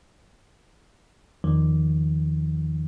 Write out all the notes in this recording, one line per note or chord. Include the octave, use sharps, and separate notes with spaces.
E2 D#3 F3